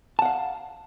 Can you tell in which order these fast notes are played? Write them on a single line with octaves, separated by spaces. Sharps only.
A5 F#5 F5